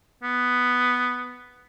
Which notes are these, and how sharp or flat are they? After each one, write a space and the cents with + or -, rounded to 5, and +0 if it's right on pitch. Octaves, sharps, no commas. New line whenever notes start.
B3 +5